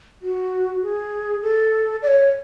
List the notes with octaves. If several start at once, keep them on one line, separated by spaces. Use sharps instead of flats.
F#4
G#4
A4
D5
C#5